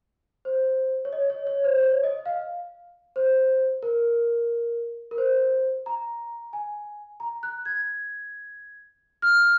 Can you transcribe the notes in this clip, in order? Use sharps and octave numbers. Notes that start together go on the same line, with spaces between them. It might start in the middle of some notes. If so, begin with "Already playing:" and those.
C5
C#5
D#5
C#5
C#5
C5
C5
C#5
D#5
F5
C5
A#4
A#4
C5
A#5
G#5
A#5
F#6
G#6
F6